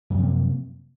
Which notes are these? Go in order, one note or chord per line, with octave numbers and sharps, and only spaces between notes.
F#2 C3 F3 A#3